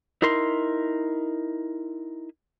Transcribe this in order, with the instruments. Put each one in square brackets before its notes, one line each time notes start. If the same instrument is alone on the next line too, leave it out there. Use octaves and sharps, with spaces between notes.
[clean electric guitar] D#4 E4 A#4 C6